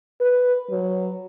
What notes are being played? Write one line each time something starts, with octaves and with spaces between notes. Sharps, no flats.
B4
F#3